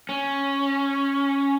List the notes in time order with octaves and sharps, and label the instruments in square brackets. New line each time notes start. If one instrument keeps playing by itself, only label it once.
[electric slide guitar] C#4